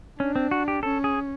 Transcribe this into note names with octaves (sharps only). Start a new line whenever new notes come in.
C#4 D4
C4
F#4
G4
C#4 A4
G#4